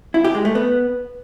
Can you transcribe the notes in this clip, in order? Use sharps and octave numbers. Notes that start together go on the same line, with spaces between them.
E4
G4
G#3
A3
B3